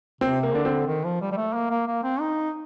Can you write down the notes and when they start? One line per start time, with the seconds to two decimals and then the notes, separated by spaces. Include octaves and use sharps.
0.21 C3 C4
0.43 A#3
0.54 D3 D4
0.65 C4
0.87 D#3
1.05 F3
1.21 G3
1.32 G3
1.37 A3
1.54 A#3
1.70 A#3
1.87 A#3
2.03 C4
2.21 D#4